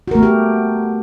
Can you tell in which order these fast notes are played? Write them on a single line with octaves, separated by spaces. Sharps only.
F#4 A#4 A3 B3 G4